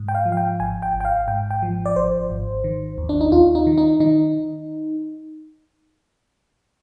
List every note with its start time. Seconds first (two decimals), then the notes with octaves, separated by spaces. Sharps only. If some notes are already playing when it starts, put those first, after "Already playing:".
Already playing: G#2
0.08 G5
0.15 F5
0.26 F3
0.32 F5
0.37 G5
0.60 G#1 G#5
0.82 G5
0.94 G#1
1.00 G5
1.05 F5
1.28 G#2 G5
1.51 G5
1.62 F3
1.86 D5
1.96 G#1 C5
2.30 G#1
2.64 D#3
2.98 D#2
3.09 D4
3.21 D#4
3.32 D#2 F4
3.55 D#4
3.67 D#3
3.78 D#4
4.00 D#3 D#4